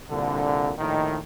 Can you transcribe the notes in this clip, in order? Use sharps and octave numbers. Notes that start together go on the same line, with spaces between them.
C2 A#2 D3
A#1 A2 D#3